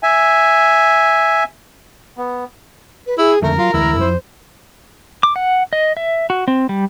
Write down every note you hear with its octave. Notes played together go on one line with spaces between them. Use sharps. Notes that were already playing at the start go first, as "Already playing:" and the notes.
E5 G#5
B3
B4
E4 G#4
F2 D3 D#3 A3 A#4
F#3 F4
D2 E3 G#3 E4
F2 F3 C5
D6
F#5
D#5
E5
F#4
C4
G3